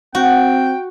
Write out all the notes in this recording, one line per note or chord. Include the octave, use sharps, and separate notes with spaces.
C4 F#4 G5